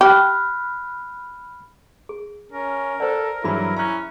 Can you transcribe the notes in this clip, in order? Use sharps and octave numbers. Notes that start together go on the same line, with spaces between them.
G4 B5 F6 F#6
G#4
C#4 A#4
A4 C5 D5 F#5
G2 E3 F#3 E4 G#4 B5
C#4 A#5 F#6